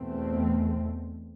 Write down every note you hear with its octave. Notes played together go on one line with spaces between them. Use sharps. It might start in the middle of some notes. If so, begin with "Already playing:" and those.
Already playing: E2 B2 A3 C4